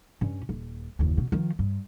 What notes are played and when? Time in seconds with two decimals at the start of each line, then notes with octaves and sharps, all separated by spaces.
0.21 G2 C#4
0.49 D#1
0.99 F#1 D#2
1.17 B2
1.32 D#3 F3
1.59 G2